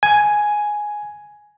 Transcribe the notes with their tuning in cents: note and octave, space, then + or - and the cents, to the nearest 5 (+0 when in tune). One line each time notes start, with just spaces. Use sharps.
G#5 +5